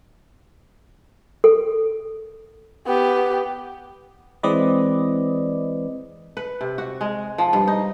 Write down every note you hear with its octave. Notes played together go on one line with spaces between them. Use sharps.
A4
B3 G4
E3 G#3 C4 B4 D5 D#5
B4
C3
F#4
G#3
F3
G2
D#4